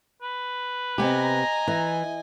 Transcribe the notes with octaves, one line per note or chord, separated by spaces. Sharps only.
B4
C3 B3 G4 D#5 G#5 A#5
E3